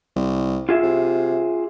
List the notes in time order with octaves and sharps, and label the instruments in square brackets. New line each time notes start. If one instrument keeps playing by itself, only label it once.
[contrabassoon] C2
[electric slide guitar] F4 G#4 E5
[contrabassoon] C3